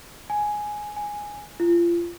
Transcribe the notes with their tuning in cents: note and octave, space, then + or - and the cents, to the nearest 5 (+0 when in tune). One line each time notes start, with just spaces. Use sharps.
G#5 +5
G#5 -5
F4 -30